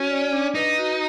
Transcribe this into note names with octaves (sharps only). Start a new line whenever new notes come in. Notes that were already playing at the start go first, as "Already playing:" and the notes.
Already playing: C#4 F#4
D5
D4
D#4 B4
F#4